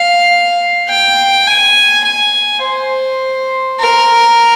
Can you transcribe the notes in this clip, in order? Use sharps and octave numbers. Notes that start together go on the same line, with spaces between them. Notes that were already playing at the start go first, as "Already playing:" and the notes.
Already playing: F5
G5
G#5
G#5
C5
A#4